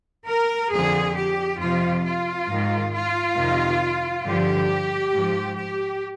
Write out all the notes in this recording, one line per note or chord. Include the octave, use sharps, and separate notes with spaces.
A#4
F2 D3 F3 G#4
G4
F2 C3 F3 F4
F4
G#2 D#3
F4
F2 C3 D#3
G2 D3 F3 G4
G#2 F3
G4